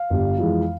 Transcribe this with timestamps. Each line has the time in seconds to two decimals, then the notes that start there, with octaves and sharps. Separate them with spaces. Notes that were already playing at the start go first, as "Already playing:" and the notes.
Already playing: F5
0.10 G1 G2 G3
0.39 F2 E3 G#3